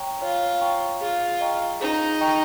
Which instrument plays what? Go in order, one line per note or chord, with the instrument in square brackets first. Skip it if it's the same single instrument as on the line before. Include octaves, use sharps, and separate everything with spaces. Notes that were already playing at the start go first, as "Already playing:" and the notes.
Already playing: [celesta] C#5 G5 A#5 C#6
[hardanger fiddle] F4 [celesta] C#5
[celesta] G5 A#5 C#6
[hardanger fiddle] F4 [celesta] G#4
[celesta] D#5 G5 A#5 C#6
[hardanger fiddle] D#4 [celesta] G#4
[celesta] D#5 G5 A#5 C#6